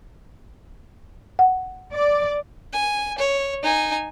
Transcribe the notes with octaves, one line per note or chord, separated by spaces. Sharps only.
F#5
D5
G#5
C#5
D#4 G#5